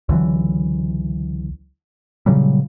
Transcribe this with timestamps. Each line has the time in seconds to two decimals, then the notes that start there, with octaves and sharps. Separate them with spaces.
0.09 C#2 D3 E3 F#3
2.26 A#2 C#3 F#3 G3